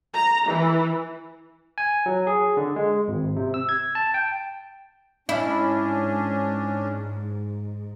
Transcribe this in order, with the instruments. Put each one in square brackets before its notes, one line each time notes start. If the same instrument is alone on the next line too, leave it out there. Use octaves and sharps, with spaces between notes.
[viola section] A#5
E3
[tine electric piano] G#5
F#3
G#4
D3
G#3
G#1
C3
E6
G#6
A5
G5
[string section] G#2 [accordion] C#4 D4 [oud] E4